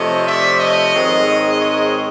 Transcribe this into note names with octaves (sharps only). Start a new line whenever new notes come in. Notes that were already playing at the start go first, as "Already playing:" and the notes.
Already playing: C3 F3 A3 C#5 D#5
D5 E5
C#5 D#5
G#2 D#3 G#3 C4
C#5 D#5